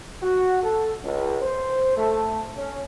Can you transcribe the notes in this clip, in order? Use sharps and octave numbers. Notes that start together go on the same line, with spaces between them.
F#4
A4
C#2
C5
A3
C#4